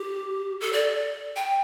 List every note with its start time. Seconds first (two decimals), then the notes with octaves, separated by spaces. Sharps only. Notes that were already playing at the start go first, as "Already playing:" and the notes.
Already playing: G4
0.61 A4
0.73 D5
1.36 G5